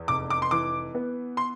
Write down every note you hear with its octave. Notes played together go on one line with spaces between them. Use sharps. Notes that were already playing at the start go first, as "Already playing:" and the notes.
Already playing: E2
F1 D6
D6
C6
E3 D6
B3
C6